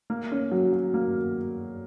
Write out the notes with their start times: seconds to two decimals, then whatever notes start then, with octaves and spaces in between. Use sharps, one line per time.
0.10 A#3
0.32 C#4
0.51 F#3
0.72 F#3
0.94 A#3